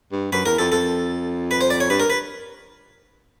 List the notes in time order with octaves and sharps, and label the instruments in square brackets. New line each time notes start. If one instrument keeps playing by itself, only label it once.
[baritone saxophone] G2
[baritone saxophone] F#2 [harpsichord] B4
[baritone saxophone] E2 [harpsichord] A#4
[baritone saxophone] F2 [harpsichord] A4
[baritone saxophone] F2 [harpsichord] A4
[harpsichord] B4
C5
D5
C#5
[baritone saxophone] G2 [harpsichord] B4
[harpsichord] A#4
B4